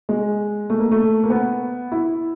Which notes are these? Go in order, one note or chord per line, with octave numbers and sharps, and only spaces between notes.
G#3
A3
A#3
A3
A#3
B3
E4